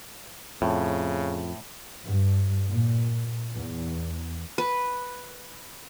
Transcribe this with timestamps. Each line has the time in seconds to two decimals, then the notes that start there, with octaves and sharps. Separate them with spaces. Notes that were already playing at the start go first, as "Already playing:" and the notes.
0.62 F2 A2 C#3
2.04 G2
2.67 A#2
3.54 E2
4.58 B4